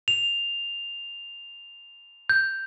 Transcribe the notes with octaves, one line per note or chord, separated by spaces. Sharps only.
F7
G6